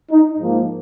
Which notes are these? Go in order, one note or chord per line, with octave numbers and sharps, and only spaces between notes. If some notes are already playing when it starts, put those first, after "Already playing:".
D#4
G#2 F3 A#3